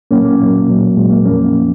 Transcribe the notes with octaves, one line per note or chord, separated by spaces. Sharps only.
A#2 F#3 A#3 C#4
A#3
A#2 F#3
A#2 F#3
A#2 F#3 G#3
A#3
F2 F3 A#3 C#4
F3